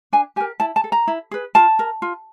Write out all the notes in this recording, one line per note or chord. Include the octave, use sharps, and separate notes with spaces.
D4 G#5
G4 A#4 G#5
E4 A5
A5
A4
A#5
E4
G#4 B4
F4 A5
A#4
F4